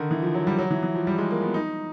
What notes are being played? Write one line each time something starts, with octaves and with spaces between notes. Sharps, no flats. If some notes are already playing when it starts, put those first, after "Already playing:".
Already playing: D3 D#3
E3
F3
F#3
G3
F#3
E3
E3
F3
G3
G#3
A#3
B3
D#4